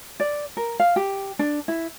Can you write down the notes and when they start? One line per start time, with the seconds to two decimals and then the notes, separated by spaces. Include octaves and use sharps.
0.20 D5
0.57 A#4
0.80 F5
0.96 G4
1.39 D4
1.68 E4